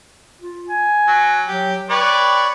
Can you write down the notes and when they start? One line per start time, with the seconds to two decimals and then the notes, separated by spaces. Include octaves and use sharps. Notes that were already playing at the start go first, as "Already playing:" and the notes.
0.41 F4
0.69 G#5
1.08 F#3
1.48 F#3 G4
1.90 B4 C#5 D5 G5